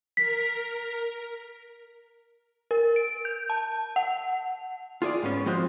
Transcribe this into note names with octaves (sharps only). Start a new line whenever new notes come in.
A#4 B6
A#4
D7
G6
A5
F#5
F4 G#4 C#5 D5
G#2 B3 C#4
F3 G#3 C4 F4 F#4